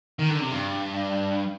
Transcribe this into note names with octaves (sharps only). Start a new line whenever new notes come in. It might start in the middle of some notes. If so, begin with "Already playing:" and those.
D#3
D3
C3
G2